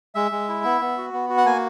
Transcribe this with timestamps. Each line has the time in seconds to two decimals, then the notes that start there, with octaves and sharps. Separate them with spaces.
0.15 G#3 E5
0.31 G#3
0.49 E4
0.64 B3
0.81 B3
0.98 F#4
1.13 B3
1.30 F#4
1.37 F#5
1.45 A#3 G#5